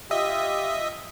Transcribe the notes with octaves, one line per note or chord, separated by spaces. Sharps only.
F4 G4 D#5 E5 D#6